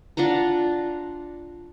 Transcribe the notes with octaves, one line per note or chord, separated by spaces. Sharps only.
D4 F4 F#5 A#5